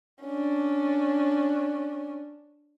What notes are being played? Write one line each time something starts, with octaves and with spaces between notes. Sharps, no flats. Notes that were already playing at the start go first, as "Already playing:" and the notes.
C#4 D4